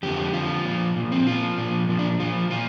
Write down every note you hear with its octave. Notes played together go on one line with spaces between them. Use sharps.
F2 D3 F3 G4
F2 D3 F3 F4
A#2 F3
A#2 F3
C4
A#2 F3 F4
A#2 F3
A#2 F3
D4
A#2 F3 F4
A#2 F3 F4